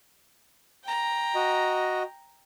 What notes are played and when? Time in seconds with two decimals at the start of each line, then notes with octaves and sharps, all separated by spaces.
0.84 G5 A#5
1.35 F#4 D#5